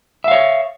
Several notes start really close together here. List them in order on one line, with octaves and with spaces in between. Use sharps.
E5 F5 C#5